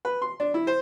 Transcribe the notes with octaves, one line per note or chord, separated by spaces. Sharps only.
B4
C6
D4
E4
C5